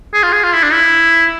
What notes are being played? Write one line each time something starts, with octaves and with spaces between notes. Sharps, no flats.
G#4
F4
G#4
F4
E4
D4
E4